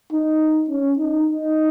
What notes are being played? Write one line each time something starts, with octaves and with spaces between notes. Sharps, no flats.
D#4
C#4
D#4
D#4